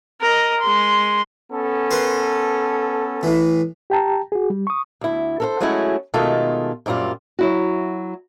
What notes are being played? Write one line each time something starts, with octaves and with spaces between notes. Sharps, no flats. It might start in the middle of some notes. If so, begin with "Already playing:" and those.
A#4 D#5
G#3 C6
B3 C#4 A4
A#4 B4 C6
A2 E3
G4 G5 A5 A#5
F#4 G#4
G3
C#6 D#6
D2 E4
A4 A#4 C5
F#3 G#3 A3 C#4 E4 F#4
B2 D#3 G#3 A3 F4 A4
F#2 A#2 G3 C4 F4
F#3 E4 F#4